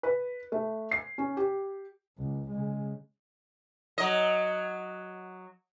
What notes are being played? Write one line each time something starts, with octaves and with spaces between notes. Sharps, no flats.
B4
A3
C7
C#4
G4
C#2
C#3 G#3
F#3 D#5